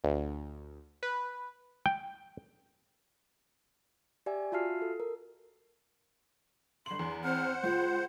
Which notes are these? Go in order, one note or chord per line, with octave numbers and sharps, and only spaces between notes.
D2
B4
G5
G4 D5 E5 G#5
F4 F#4 E5 A5 F6 C7
A4
A#4
G1 C6 F#7
E2
C4 C5 F#5 F6
C#2 F4 G6